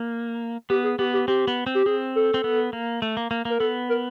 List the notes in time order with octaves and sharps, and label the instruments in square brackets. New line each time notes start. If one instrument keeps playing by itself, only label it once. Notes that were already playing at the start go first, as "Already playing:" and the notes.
Already playing: [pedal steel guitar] A#3
[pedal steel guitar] B3 [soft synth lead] G4
[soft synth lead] G#4
[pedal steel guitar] B3 [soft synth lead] G4
[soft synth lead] G4
[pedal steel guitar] C4 [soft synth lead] G4
[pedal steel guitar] B3
C4
[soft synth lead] G4
[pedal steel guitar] C4 [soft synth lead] G#4
[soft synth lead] A4
[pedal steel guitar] C4
B3
A#3
A3
A#3
A#3
[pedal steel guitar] A#3 [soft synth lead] A#4
[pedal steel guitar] B3 [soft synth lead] A4
[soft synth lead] A#4